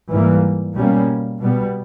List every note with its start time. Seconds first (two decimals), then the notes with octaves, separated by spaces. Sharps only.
0.11 G#2 E3 G3 A#3
0.75 B2 G3 A#3 C#4
1.40 B2 G3 B3